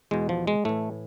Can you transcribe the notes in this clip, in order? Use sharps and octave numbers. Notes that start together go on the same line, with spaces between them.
E2 B2 G#3
F3
G#3
A2 E3 A3